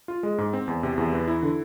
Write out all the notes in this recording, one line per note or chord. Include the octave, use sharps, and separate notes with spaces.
F4
G#3
G#2
C4
E2
C3
E2
E3
E4
D3